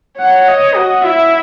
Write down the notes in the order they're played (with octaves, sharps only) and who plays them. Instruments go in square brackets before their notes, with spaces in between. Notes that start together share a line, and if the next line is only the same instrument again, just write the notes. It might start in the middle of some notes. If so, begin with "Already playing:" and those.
[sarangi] C#5 [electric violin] F#5
[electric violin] D#5
[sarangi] F#4
[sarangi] E4 [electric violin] E5